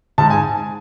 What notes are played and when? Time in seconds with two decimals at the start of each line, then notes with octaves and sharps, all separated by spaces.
0.18 G#2 A5
0.30 G#5